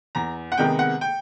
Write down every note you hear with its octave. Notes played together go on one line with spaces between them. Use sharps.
E2 A#5
F#5
C3 D#3 G#3 B3 G5
F#5
G5